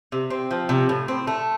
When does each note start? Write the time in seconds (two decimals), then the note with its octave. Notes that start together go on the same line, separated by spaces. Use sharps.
0.12 C3
0.30 C4
0.51 F3
0.69 C3
0.89 A2
1.08 C4
1.27 A3